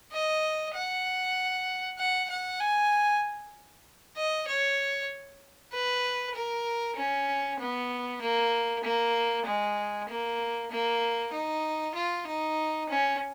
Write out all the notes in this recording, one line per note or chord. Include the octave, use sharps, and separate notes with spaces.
D#5
F#5
F#5
F#5
G#5
D#5
C#5
B4
A#4
C#4
B3
A#3
A#3
G#3
A#3
A#3
D#4
F4
D#4
C#4